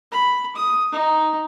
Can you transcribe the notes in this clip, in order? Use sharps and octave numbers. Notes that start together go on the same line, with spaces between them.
B5
D#6
D#4